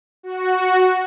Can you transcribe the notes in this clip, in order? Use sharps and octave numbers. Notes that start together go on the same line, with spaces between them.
F#4